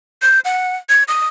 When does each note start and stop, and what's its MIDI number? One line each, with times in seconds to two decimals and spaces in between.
0.22 0.40 91
0.45 0.76 78
0.89 1.03 92
1.08 1.28 87